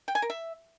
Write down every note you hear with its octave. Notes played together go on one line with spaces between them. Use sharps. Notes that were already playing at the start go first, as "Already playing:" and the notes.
G5
G#5
A#4
E5